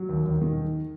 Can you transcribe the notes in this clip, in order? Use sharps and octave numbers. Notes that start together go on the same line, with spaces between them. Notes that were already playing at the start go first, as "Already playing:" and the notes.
Already playing: F#3
D#2
D#2
D#3